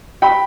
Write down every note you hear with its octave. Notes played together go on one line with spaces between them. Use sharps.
G5 B5